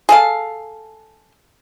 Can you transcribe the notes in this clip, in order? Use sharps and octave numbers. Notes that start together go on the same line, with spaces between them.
G#4 A4 F5